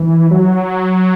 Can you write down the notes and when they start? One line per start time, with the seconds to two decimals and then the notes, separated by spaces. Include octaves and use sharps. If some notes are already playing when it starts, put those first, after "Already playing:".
Already playing: E3
0.31 F#3